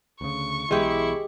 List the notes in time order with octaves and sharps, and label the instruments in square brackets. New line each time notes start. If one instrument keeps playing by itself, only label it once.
[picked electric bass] D2 C#3 [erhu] C#6
[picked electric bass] B1 B2 E3 [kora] G#3 G4 [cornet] E4